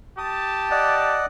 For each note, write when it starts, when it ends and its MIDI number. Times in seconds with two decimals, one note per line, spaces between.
0.18 1.21 67
0.18 1.21 81
0.18 0.69 87
0.71 1.26 74
0.71 1.26 75
0.71 1.26 78